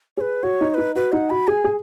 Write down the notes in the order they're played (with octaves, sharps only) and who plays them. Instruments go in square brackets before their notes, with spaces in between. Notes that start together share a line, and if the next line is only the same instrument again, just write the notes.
[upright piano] G#4 [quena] B4 C#5
[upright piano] F#4 [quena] C#5
[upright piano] D#4
[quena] C#5
[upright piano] D#4 [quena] B4
[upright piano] F#4 [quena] B4
[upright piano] D#4 [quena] F#5
[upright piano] F#4 [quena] B5
[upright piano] G#4 [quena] G#5
[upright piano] G#4